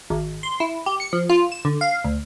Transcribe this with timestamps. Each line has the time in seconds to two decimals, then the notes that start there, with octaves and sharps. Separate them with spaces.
0.10 G#1
0.43 C6
0.60 E4
0.86 G4
1.00 C#7
1.13 F3
1.30 F4
1.52 E7
1.65 D3
1.81 F5
2.04 D2